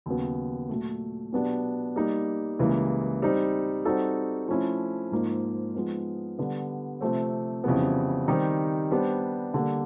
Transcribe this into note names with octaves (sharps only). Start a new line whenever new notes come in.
D#2 C#3 F#3 B3
A#2 F#3 A3
B2 F#3 B3 D4 G4
G3 A#3 D#4
C#2 C#3 E3 G3 A#3
G3 C4 D#4
G3 C4 D#4 F#4 A4
F3 A3 C#4 E4
G#2 F3 A#3 D#4
F3 G#3 B3 D#4
D3 G3 B3
C3 F3 A3 C4
F2 C#3 E3 G3 B3
D#3 G3 C4 D#4 G4
G3 B3 D4 G4 C5
D3 G3 A#3